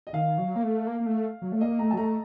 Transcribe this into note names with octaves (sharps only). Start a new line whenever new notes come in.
D#5
D#3 F5
F#3
A#3
A3
A#3
A#3
A3
F#3
A3
A#3 D#5
A3 A#5
F#3 A5
A3 A#5